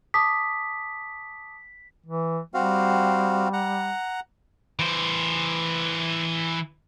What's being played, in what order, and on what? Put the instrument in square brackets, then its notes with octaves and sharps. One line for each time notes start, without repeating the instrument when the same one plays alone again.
[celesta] A5 D6 D#6 [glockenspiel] B6
[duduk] E3
[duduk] G3 [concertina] C4 F#4 F5
[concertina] F#5 A#5
[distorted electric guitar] E3 C5